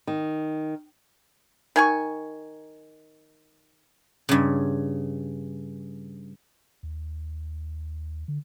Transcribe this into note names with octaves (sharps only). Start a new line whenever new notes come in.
D#3
D#3 G#5 C#6
G2 C#3
D#2
D3